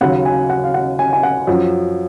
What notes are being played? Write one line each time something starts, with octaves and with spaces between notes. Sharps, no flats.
D#2 C#3 F#3 F#5
G#5
F#5
F5
F#5
G#5
G#5
F#5
F#2 F3